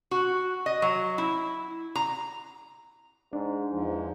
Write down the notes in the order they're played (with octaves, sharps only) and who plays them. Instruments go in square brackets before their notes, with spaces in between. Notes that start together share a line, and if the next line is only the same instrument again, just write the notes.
[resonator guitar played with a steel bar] F#4
D#5
F#3
E4
A#5
[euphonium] G#2 [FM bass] D4
[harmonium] E2 F3 [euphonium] G#2